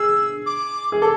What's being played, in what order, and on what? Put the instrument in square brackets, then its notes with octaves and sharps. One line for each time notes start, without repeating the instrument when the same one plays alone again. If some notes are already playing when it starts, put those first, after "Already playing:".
Already playing: [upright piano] G#4 [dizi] E6
[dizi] D6
[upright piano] G#4
[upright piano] A4 [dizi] D6